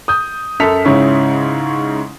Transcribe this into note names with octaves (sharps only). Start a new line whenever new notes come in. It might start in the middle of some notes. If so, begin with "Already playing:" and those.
D#6 G6
F#2 A4 B6 F7
G#2 C#3 C#4 E4